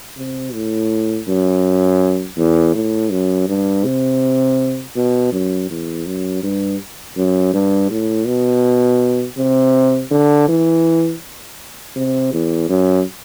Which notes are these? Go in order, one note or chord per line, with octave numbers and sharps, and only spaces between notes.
C3
A2
F#2
E2
A2
F#2
G2
C3
B2
F#2
E2
F#2
G2
F#2
G2
A2
B2
C3
D3
E3
C3
E2
F#2